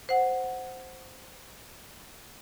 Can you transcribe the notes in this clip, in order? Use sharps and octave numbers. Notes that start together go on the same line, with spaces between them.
C5 F#5